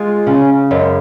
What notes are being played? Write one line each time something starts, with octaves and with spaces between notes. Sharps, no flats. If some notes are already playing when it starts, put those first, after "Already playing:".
Already playing: G#3 F4
C#3 C#4
F#2 G#3